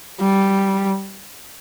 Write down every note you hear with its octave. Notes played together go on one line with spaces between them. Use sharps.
G3